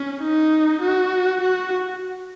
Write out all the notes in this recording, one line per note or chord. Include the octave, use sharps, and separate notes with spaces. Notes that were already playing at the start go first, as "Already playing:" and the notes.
Already playing: C#4
D#4
F#4
F#4